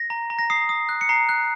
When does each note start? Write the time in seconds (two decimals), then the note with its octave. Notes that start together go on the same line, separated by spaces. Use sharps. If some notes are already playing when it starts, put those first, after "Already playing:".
Already playing: A#6
0.10 A#5
0.30 A#5
0.39 A#6
0.50 D#6 C7
0.69 D#6
0.89 F#6
1.01 C#7
1.09 A#5 C7
1.29 F#6